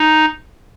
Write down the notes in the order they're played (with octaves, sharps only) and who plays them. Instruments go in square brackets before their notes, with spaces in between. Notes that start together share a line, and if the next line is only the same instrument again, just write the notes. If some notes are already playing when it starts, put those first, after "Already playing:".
Already playing: [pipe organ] D#4